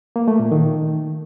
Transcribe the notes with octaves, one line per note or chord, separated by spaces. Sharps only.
A#3
A3
A#2
D#3